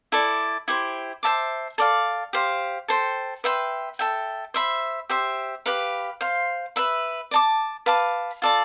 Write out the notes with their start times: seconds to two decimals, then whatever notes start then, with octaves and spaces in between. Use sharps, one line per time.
0.12 E4 A4 D5
0.68 E4 G4 C5
1.23 C5 E5 A5 D6
1.78 A4 D5 F5
2.33 G4 C5 F5
2.88 A4 C5 G5
3.44 B4 E5 G5 C6
3.99 A4 E5 G5
4.54 C5 E5 B5
5.09 G4 C5 E5
5.66 G4 B4 F5 B5
6.21 C5 F5 C6
6.76 B4 E5 B5
7.31 D5 A5 D6
7.86 B4 F5 A5 D6
8.42 F4 A4 D5 A5